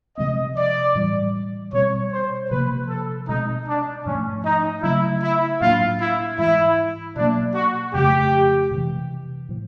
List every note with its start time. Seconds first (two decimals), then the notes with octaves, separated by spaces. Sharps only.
0.17 C3 F3 G#3 C4 D#5
0.57 D5
0.95 A2 E3 G3
1.73 B2 G3 C4 C#5
2.13 C5
2.51 C3 F3 A#3 B4
2.89 A4
3.28 B2 G#3 C4 D#4
3.68 D4
4.05 G#2 F3 A3 C#4
4.45 D#4
4.83 C#3 F#3 A3 C#4 E4
5.22 E4
5.61 A2 F#3 A#3 D4 F4
6.00 E4
6.38 G#2 E3 G#3 E4
7.16 B2 F#3 A#3 D4
7.55 F#4
7.94 F2 C#3 F3 A3 G4
8.71 C3 E3 G#3
9.49 A2 F3